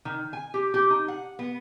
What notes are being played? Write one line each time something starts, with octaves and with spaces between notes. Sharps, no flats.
D#3
G#5
G4
G4
D#4
F#5
B3